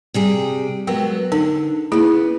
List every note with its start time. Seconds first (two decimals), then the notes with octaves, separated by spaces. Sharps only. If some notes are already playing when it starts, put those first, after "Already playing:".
0.14 C3 G3 G#4
0.87 F#3 G#3 B3 A#4 G5
1.32 D3 D#4 A#4
1.92 C#3 A#3 B3 E4 G#4